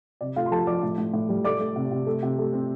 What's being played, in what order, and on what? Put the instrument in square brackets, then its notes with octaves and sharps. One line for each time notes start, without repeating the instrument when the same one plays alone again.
[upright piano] C3 D5
A3 F4 F5
C6
F3 A4 A5
F3 D5 D6
A2
A2
A2
G3
A3 D5 D6
A3
C3
C3
A3
C3
A3
C4